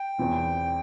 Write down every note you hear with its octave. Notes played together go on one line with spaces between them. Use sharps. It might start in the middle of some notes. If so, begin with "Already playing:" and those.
Already playing: G5
E2 E3 C4